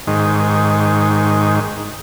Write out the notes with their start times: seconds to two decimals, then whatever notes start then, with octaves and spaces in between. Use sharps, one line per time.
0.07 G#2 D#3